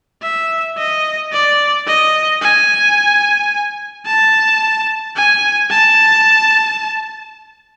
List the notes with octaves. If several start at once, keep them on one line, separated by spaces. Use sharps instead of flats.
E5
D#5
D5
D#5
G#5
A5
G#5
A5